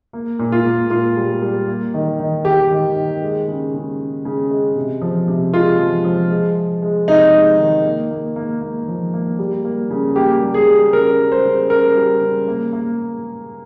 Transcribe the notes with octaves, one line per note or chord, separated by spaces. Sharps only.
A#3
A#2
F4
A#2
A#2 F4
G3
G3
A#3
D#3
D#3
D#3 G4
D#3
D#3
G#3
C#3
C#3
C#3
C#3
G#3
C3
F3
C3
G#3 F4
F3
F3
G#3
G#3
G#3
C3 D#4
G#3
D#3
A#3
A#3
A#3
A#3
F3
A#3
G3
A#3
C#3
A#3 G4
G3
G#4
G3
C#3 A#4
G3
C5
C#3
C#3 A#4
G3
C#3
A#3
A#3